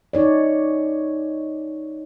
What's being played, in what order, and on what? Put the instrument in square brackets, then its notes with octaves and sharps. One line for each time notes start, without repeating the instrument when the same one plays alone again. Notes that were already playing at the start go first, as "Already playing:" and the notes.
[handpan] D#4 C#5 D5